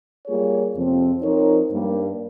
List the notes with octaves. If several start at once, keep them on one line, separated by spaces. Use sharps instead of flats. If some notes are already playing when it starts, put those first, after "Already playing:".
G3 A#3 F4 G#4 C#5
F2 C3 F3 C4
F3 C4 D#4 A#4 C#5
G2 G3 A#3